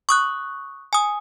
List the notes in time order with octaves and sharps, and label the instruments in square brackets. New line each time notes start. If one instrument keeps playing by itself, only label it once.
[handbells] C#6 D#6 F#6
G#5 D#6